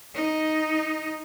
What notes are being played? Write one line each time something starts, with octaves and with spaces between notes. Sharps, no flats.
D#4